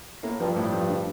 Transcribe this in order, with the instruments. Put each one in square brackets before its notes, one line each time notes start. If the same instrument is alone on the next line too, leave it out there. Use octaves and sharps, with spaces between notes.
[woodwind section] A2 [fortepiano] A#3
[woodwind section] G2 [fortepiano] F3
[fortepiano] A2
F3
D3